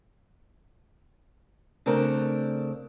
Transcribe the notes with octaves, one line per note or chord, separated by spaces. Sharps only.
C#3 A3 C4 D4 A#4